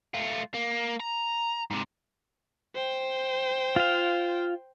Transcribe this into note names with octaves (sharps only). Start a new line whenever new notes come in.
A3 F4
A#3
A#5
G#2 C3
C5 G5
F4 F5